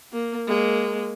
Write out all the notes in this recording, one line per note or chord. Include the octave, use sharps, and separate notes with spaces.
A#3
G#3 A#3